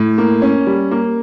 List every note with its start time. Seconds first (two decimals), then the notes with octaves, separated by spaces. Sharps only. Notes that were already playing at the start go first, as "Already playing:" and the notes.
Already playing: A2
0.18 A#3
0.42 C#4
0.67 G3
0.91 A#3